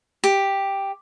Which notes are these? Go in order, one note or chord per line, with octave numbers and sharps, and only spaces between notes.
G4